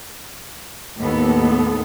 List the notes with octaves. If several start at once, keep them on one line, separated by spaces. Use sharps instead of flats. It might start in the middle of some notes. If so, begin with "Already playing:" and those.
D#2 A2 B3 A4